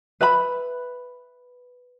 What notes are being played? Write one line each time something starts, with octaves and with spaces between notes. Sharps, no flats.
B4 E5 B5